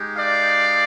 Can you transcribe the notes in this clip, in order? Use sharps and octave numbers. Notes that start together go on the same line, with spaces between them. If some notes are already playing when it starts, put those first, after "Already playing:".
Already playing: G#3 D#4 G4
D5 F5